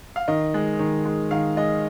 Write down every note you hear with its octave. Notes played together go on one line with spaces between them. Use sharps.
F5
D#3 D#5
G#3
D#3
G#3
D#3 F5
G#3 D#5